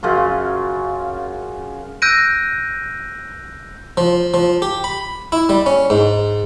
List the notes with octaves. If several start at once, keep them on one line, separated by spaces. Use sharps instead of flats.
F#2 C#3 F4 C6
E6 F#6 G6 A#6 D7 D#7
F3
F3
G4
B5
E4
G3
C#4
G#2